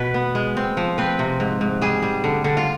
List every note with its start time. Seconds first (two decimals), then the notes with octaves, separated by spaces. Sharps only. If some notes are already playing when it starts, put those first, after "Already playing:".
Already playing: B2 B4
0.14 B3
0.35 G#3
0.57 C4
0.77 F3
0.98 C4 B4
1.19 C3
1.40 G#2
1.61 G#2
1.81 G3 G#4
2.02 G3
2.24 D3
2.44 D3
2.57 F4